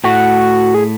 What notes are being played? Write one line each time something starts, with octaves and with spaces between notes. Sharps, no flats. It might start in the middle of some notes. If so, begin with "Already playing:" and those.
A2 A3 F#4
G#4